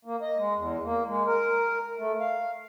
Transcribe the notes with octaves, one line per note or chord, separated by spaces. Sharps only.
A#3
D#5
G#3
E2
A#3
G#3
A#4
A3
F5